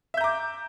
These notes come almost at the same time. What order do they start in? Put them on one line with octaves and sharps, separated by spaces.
E5 G6 A#5 D6